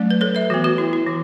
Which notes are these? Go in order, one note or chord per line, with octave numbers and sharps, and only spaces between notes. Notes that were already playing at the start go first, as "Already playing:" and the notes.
Already playing: F#3 A3 C#4
B4
A4 C#5
B4 E5
E3 B3 F#4
F#4 B4
E4
E4
E3